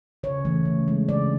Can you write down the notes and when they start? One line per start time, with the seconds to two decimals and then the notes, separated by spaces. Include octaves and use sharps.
0.23 C#3 C#5
0.45 E3 A3
0.65 C#3
0.88 G#3
1.09 C#3 D5